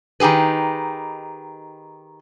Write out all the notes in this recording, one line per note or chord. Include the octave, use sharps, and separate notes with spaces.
D#3 D#4 G4 G#4 B4